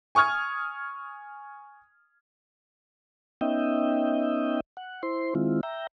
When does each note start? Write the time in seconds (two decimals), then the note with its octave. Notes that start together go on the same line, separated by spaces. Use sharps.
0.15 G#5 C#6 D#6 F6 G#6
3.41 B3 C#4 D#4 D#5 E5 G5
4.77 F#5
5.03 E4 C5 C6
5.35 D#3 G#3 C4 E4 F4
5.63 E5 G5 A#5